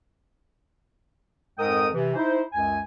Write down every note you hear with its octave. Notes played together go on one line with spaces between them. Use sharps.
F2 G#2 G#3 A#4 G5 D#6
C3 E3
D#4 E4 C5
C#2 F#2 G#5